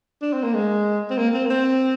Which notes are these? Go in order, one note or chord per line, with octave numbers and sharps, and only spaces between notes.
D4
C4
A#3
G#3
C4
A#3
C4
A#3
C4